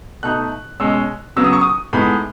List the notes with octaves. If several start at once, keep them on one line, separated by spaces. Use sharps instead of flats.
B2 A3 D#4 F#6
B2 G#3 C#4 E6
C#3 F#3 B3 E6
D#6
C#6
D#6
A2 G#3 B3 D#4 B5